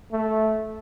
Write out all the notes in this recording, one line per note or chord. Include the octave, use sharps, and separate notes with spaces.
A3